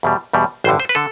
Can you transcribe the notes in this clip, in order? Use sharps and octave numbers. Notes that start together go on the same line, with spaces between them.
E2 B2 G3
E2 B2 G3
A1 G2 D3 C5
C5
B4
D3 A4